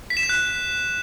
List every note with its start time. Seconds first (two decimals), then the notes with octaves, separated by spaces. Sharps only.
0.10 B6
0.17 E7
0.23 B6
0.29 F#6